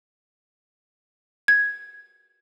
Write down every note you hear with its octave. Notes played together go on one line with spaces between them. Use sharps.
G#6